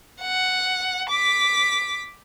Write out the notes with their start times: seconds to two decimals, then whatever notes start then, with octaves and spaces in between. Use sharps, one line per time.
0.22 F#5
1.09 D6 B6